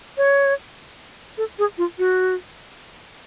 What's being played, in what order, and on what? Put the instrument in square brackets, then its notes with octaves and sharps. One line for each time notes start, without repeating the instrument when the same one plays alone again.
[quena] C#5
A4
G#4
F4
F#4